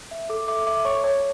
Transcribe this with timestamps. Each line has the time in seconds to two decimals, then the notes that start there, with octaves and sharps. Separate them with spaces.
0.11 E5
0.29 A4 D6
0.48 E5 D6
0.67 E5 D6
0.85 C#5 C#6
1.04 C#5